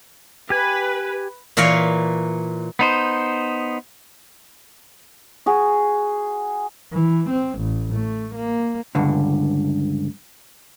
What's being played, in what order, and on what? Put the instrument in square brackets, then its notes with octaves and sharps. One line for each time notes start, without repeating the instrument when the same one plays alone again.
[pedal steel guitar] G4 G#5 [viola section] B4
[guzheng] A#2 E3 A#4 C#5 F5
[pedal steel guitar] B3 D#4 C5
[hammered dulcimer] F#4 G#4
[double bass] E3
C4
A1
A3
A#3
[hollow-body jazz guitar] C#2 G2 D3